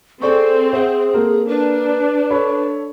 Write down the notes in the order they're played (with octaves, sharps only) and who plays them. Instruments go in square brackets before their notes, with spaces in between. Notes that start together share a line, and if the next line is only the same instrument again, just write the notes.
[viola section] C4 [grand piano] G#4 D5 C#6 [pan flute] A4
[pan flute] G#4 [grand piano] C5 E5 F#5
[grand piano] A#3 A4 A#4
[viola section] D4 [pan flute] B4
[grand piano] A4 C#5 B5